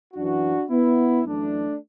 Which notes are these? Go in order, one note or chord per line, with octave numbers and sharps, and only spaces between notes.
F#2 E3 D4 F#4
B3 E4
F#2 E3 A3 D4